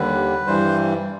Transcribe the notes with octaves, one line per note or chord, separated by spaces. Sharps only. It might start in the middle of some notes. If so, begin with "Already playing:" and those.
Already playing: D#2 D3 G3 B4
G2 E3 G3 C5